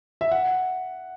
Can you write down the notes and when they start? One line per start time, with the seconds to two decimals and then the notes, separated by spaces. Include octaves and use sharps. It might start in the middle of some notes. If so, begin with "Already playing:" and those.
0.21 E5
0.32 F#5